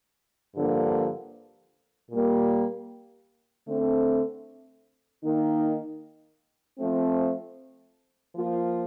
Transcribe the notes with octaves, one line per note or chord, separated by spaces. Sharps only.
G2 D3 F3 A#3
A#2 G3 A#3
D3 A3 C4
D#3 A#3 D#4
F3 A3 C4
F3 A#3 F4